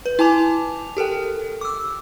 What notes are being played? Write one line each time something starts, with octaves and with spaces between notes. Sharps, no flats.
B4
E4 G#5 A5 D6 F7
G4 A4 A#4 G5
D6 E6